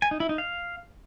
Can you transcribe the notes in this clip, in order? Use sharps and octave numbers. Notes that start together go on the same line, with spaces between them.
G#5
D#4
E4
D#4
F5